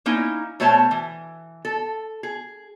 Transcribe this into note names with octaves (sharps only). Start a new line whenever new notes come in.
A#3 C#4 D#4 E4
B2 A3 C5 C#5 A5
E3
A4
G#4